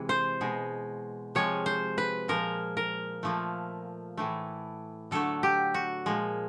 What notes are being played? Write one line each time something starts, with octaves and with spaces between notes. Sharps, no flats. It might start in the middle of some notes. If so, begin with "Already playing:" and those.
Already playing: C3 E3 G#3
C5
B2 G#3
C3 F3 G#3 C#5
C5
B4
A#2 F3 G#3 A#4
A#4
A#2 F3 A3
A2 E3 A3
D3 F#3 A3 A4
G4
F#4
A#2 F3 G#3